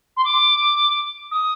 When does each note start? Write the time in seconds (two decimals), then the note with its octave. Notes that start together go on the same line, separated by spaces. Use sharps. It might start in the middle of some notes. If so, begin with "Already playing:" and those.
0.16 C6
0.24 D6
1.31 D#6